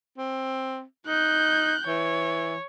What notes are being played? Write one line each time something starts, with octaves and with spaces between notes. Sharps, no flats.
C4
D#4 F#6 G6
E3 C#5